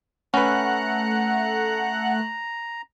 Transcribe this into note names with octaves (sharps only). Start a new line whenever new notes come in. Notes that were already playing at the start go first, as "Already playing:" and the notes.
A3 C#4 B4 F#5 A#5 F#6